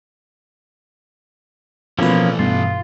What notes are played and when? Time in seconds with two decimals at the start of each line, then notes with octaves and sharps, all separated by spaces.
1.99 B2 E3 F3 A3 A#3 C#4 F4 B4
2.39 G2 B2 F4